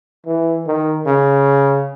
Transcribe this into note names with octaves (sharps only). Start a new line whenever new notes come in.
E3
D#3
C#3